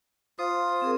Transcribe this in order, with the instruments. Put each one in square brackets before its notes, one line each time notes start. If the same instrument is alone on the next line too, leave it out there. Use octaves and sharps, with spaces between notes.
[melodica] F4 D#6 [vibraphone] C5
[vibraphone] C4 G#4 A#4